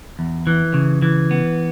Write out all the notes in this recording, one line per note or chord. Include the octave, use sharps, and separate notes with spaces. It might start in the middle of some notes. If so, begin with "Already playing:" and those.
E2
E3
C#3
E3
B3